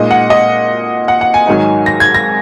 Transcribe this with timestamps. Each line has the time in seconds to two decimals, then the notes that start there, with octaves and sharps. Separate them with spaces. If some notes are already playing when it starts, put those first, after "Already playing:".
Already playing: A#2 G#3 D#4 D#5
0.11 F#5
0.30 D#5
1.08 F#5
1.21 F#5
1.34 G#5
1.47 G#2 D#3 F#3 D#4
1.86 A#6
2.00 G#6
2.14 A#6